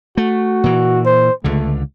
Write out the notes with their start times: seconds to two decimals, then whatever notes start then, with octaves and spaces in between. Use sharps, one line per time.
0.17 A3 F#4
0.64 A#2 E3
1.06 C5
1.44 C#2 D3 A3